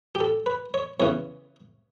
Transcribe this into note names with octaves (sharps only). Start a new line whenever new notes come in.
G4
A4
B4
C#5
E2 C#3 E3 C#5